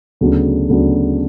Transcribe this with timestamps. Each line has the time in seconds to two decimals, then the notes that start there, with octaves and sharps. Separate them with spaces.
0.21 D2 C#3 F#3 B3 D4
0.69 D2 C#3 F#3 B3 D4